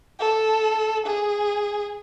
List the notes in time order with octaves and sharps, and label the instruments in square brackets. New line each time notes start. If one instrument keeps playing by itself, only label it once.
[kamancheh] A4
G#4